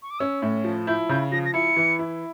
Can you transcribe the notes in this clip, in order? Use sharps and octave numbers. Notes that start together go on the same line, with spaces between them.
C#6
D6
C#4 E6
A2
F3
E4 G6
C#3 G6
F3 A#6
A#6
E4 C#7
E3
E4